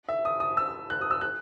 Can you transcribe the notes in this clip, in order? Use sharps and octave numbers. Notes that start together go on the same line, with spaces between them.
E5
D#6
D#6
E6
F#6
D#6
E6
F#6